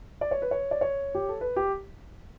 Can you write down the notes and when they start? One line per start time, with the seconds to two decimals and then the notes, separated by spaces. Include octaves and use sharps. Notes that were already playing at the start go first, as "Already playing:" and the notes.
0.21 D5
0.31 C#5
0.42 B4
0.51 C#5
0.71 D5
0.81 C#5
1.15 G4
1.28 A4
1.41 B4
1.56 G4